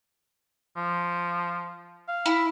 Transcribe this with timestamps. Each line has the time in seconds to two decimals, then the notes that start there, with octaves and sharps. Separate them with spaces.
0.76 F3
2.08 F5
2.26 E4